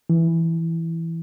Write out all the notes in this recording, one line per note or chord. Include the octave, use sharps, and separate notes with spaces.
E3